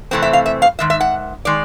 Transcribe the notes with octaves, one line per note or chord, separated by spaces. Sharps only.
C3 E3 A3 C4
E5
F5
E5
F5
G#2 D#3 E5
E5
F#5
D#3 G#3 D5